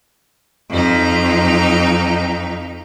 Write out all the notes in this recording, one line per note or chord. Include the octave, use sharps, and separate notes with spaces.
F2 D#4